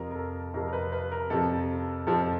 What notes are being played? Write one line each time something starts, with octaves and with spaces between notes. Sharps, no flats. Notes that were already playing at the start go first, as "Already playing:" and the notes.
Already playing: F2 C3 F3 A#4
A#4
A4
F2 C3 F3 A#4
A#4
B4
B4
A#4
F2 C3 F3 A4
F2 C3 F3 A4
A4